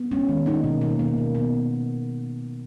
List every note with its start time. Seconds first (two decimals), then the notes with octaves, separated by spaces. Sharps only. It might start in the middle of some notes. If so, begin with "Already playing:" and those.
Already playing: B3
0.11 G#3 C#4
0.29 D#3
0.46 A#3 D#4
0.64 B2
0.81 A#3
0.99 A#3
1.18 B2
1.35 B3